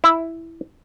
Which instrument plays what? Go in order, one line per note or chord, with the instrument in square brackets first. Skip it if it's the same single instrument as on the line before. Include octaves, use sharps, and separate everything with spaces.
[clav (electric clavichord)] E4